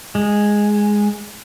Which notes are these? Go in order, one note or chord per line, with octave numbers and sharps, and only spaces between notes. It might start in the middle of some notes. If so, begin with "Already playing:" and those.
G#3